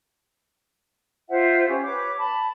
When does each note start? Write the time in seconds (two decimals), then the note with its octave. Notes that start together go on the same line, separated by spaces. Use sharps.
1.28 F4 C5 E5 F#5
1.67 C#4 G4
1.83 B4 C#5 D6
2.18 A5 B5